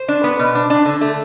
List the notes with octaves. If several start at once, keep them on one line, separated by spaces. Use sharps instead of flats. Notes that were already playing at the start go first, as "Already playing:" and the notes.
Already playing: C5
D4
B3
B2
D4
D4
D3
A3